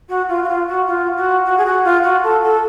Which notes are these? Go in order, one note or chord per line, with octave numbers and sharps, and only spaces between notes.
F#4
F4
F#4
F4
F#4
F4
F#4
F#4
G#4
F#4
F4
F#4
A4
A4